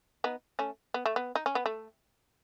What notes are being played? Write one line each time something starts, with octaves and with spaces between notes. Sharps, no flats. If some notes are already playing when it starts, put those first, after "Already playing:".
B3 D#4
A3 C#4
B3
A3
B3
D#4
C#4
B3
A3